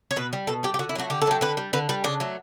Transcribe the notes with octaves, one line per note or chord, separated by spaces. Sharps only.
C#5
B2 B4
G3
B2 A4
G3 G4
G4
D3 F#4
E4
F#3 A3 F#4
D3 G4
A4
F#3 A3 G4
D3 B4
G3
D3 B4
G3 B4
C#3 D4
F#3 A3